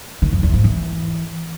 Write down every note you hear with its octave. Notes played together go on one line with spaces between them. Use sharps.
D#3
F#2
E2
G#2
E3